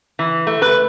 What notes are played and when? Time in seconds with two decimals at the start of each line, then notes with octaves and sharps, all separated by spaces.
0.19 E3
0.47 A3
0.62 B4